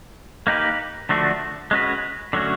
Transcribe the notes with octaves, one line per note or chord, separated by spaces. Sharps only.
A#3 D#4 G4 B4
D3 F3 A3 D4 F#4
G#3 C#4 F#4 B4
D3 F#3 A3 C#4 F#4